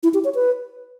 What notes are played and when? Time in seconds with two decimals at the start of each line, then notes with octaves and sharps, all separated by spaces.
0.03 E4
0.14 G4
0.24 C#5
0.35 B4